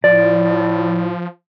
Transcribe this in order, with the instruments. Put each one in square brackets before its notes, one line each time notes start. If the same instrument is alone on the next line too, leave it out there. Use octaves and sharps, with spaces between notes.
[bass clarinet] A2 [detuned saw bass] F3 [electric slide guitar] D5